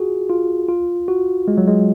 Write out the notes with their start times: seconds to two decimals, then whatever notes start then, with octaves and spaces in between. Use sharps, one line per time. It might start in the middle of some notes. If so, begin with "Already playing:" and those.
Already playing: F4 F#4 G#4
0.29 F4
0.68 F4
1.08 F#4
1.48 G#3
1.58 F#3
1.67 G#3